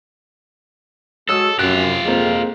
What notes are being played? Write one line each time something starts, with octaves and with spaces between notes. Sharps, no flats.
F#3 G#3 A4 C#5 D#6 E6
F#2 F4 G4 F#6
F2 G#3 A#3 C4